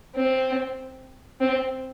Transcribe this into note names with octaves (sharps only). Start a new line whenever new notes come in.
C4
C4